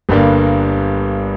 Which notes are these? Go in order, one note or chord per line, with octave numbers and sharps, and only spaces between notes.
G1 G2 D3 G3 A#3